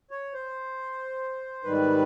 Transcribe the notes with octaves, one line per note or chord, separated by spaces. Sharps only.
C#5
C5
G#2 D#3 G3 B4